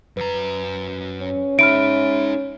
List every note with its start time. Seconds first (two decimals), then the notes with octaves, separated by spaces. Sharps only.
0.17 F#2 B4 A#5
1.22 C#4
1.59 D#4 G#4 E5 B5 F6 D7